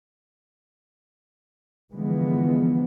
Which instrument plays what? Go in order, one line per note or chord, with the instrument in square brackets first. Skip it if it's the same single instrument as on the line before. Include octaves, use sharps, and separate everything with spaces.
[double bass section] D3 E3 F3 G#3 B3